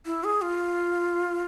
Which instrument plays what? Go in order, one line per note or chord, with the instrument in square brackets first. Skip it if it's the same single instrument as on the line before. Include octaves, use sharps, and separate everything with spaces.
[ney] E4
G#4
F4